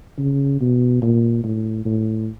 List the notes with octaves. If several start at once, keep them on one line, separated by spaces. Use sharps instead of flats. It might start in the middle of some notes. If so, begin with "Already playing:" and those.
C#3
B2
A#2
A2
A2